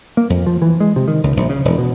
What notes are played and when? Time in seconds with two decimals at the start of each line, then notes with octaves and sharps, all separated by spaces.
0.17 A#3
0.30 F2
0.47 F3
0.62 E3
0.80 G#3
0.96 C3
1.08 D#3
1.23 C#2
1.37 A#1
1.49 C#3
1.65 E1
1.78 B2